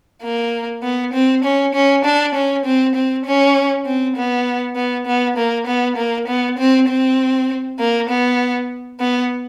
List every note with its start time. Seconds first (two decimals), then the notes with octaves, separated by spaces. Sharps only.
0.23 A#3
0.83 B3
1.13 C4
1.44 C#4
1.74 C#4
2.04 D4
2.34 C#4
2.65 C4
2.95 C4
3.25 C#4
3.86 C4
4.16 B3
4.76 B3
5.06 B3
5.37 A#3
5.66 B3
5.97 A#3
6.27 B3
6.58 C4
6.88 C4
7.79 A#3
8.09 B3
9.00 B3